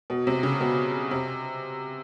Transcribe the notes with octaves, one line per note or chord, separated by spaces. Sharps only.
B2
C3
C#3
B2
C3